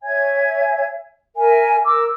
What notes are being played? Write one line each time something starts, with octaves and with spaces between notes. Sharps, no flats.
C#5 E5 G#5 G#6
A#4 E5 G#5
A#4 D6 E6